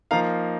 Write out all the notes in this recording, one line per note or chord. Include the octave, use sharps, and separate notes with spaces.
F3 A#3 D#4 F5 A#5